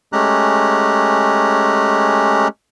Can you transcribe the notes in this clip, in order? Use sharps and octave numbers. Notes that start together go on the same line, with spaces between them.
G#3 A3 C#4 G4 A#5 F#6